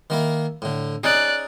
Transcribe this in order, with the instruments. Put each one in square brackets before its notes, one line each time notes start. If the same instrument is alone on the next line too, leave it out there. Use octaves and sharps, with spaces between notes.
[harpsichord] D#3 A#3 E4
A2 D3
[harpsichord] C#4 D#4 G#4 [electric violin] D5 F#6